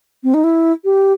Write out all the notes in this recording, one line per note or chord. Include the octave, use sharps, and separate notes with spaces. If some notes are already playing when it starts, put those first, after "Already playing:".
C4
D#4
E4
G4